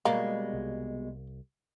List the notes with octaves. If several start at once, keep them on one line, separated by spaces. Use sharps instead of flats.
B2 G3 G#3 A#3
C2